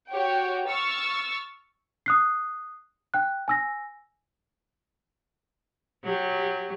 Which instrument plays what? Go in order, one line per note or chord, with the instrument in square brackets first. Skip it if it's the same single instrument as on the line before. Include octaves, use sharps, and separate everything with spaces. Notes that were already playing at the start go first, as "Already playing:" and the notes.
[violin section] F#4 G4 C#5 G5
C#6 E6 F6 A6
[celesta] D#6 F#6 C7
G5 F#6
G#5 E6 A#6
[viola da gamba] F#3 G4